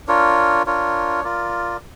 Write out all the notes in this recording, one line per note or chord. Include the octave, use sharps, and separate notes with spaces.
D4 F4 A#4 C#5
D4 F4 A#4 C#5
F4 A#4 D5